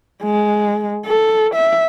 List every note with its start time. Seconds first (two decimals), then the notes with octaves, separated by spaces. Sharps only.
0.23 G#3
1.06 A4
1.55 E5